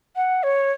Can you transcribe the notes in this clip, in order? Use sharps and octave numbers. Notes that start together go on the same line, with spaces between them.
F#5
C#5